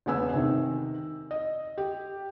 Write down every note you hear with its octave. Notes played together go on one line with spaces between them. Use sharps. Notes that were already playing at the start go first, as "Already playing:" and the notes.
E1 C#3 B3 G#5 E6
C3 D#3
D#5
G4